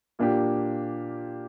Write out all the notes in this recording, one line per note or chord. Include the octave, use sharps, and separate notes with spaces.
A#2 A#3 D4 G4